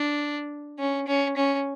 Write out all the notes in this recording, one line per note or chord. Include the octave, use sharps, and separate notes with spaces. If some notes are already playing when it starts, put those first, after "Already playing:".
Already playing: D4
C#4
C#4
C#4